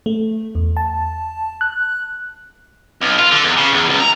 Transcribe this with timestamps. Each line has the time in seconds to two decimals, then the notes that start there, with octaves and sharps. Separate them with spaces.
0.06 A3
0.55 E2
0.77 A5
1.61 F#6
3.01 B1
3.18 F4
3.31 D3
3.44 E2
3.57 C#3
3.73 E2
3.89 C#2
4.00 A#5